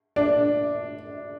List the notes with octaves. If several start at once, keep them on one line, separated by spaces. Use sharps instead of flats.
D4